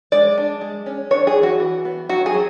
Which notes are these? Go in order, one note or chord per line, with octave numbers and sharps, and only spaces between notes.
G#3 D5
D4
G#3
C#4
D4 C#5
G#4
E3
F#4
E3
B3
F#3 F#4
G#4
F#3